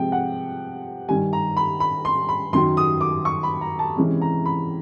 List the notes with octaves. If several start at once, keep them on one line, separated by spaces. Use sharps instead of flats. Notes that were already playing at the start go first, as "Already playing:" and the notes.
Already playing: C3 F3 G#3 G5
F#5
G2 D#3 G3 G#5
A#5
B5
B5
C6
B5
F#2 D#3 F#3 C6
D#6
D6
C#6
B5
A#5
A5
C3 E3 G#3 C#4
A#5
B5